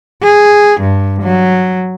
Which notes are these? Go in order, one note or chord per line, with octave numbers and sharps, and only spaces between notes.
G#4
G2
F#3